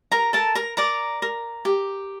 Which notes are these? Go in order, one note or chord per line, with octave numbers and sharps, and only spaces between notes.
A#4 A#5
A4 A#4 A5
A#4 A#5
A#4 D5 A#5
A#4
G4